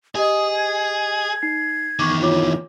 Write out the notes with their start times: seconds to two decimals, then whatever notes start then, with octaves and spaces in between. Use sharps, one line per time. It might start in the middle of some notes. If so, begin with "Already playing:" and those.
0.16 G4 G#4 D#5 D#6
0.56 G#6
1.42 D#4 C7
1.99 E2 D#3 C#6 D6
2.21 E4 F4 C#5 D6